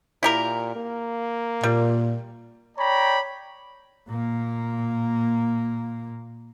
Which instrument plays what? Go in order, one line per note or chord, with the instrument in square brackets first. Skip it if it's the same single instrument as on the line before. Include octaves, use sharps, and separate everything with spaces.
[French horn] A#2 [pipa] E4 G4 A#4
[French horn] A#3
[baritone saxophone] A#2 [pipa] G3
[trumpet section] C#5 D5 G5 A#5 B5
[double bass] A#2 A#3